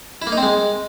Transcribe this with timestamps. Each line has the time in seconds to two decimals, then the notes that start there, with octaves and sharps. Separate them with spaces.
0.22 E4
0.27 A#3
0.32 D#4
0.37 C4
0.43 G#3